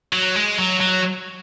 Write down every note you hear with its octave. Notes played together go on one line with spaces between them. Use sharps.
F#3
G#3
F#3
F#3